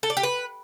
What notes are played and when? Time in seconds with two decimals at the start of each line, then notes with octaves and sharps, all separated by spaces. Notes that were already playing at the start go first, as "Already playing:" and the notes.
0.03 A4
0.10 D5
0.17 G4
0.23 B4